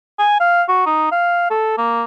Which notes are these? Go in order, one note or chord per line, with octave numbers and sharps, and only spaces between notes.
G#5
F5
F#4
D#4
F5
A4
A#3